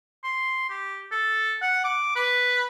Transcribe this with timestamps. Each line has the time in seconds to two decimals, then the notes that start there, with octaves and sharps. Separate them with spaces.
0.24 C6
0.69 G4
1.12 A4
1.62 F#5
1.84 D6
2.16 B4